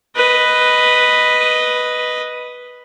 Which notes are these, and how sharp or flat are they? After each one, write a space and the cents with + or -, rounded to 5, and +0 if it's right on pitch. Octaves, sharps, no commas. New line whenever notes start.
B4 +0 D#5 +0